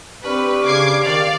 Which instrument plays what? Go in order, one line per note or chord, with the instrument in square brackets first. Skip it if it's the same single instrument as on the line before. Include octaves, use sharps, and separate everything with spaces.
[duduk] C4 [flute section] D4 C#6 F6 [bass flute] G4 [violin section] B4
[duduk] C#3 [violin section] D6 G#6 C7
[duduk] D#3 [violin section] D5 F5